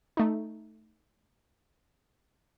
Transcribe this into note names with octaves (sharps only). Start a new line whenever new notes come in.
A3 D#4